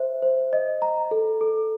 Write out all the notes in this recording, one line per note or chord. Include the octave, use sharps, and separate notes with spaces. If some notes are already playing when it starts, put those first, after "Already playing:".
Already playing: C5 E5
C5
D#5
A#5
A4
A4